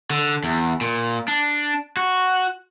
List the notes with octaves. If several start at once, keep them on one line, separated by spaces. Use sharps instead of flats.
D3
E2
A#2
D4
F#4